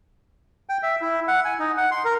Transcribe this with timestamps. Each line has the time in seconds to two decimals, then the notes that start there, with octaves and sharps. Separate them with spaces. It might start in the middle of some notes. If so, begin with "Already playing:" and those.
0.69 G5
0.83 E5
1.01 E4
1.28 F#5
1.45 G#5
1.59 D#4
1.77 F#5
1.91 C6
2.05 A#4